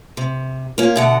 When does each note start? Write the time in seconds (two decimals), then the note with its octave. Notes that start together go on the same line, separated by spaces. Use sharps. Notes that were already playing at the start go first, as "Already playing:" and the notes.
0.17 C3
0.78 A#3 C#4 F4
0.96 B2 D3 E5 F#5